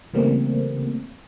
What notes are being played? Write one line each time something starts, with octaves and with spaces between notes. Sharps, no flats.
C#3 E3 G3 A3 A#3 C4